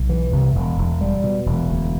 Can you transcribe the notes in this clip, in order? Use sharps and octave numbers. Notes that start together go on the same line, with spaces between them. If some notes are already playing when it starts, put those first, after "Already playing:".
Already playing: B1
E3
C2
E1
E1
G3
B2
E1
D2